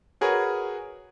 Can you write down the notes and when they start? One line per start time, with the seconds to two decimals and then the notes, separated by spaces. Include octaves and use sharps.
0.21 F#4 G#4 A#4 B4 C#5